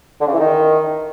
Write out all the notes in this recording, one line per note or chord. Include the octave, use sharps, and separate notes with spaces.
D3
C#3
E3
D#3